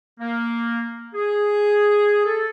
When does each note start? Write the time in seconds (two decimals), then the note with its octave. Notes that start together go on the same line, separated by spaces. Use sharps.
0.20 A#3
1.14 G#4
2.25 A4